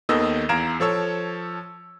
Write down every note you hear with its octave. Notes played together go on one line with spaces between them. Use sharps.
D#2 D#3 B3 A4 D#5 E6
E2 F5 A#5 G#6 D7 E7
F3 A4 C#5 E6